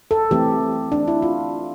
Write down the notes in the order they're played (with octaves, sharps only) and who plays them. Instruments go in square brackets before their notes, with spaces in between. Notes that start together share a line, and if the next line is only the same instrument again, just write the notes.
[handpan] A4
E3 A3 C4 G4
D4
E4
F4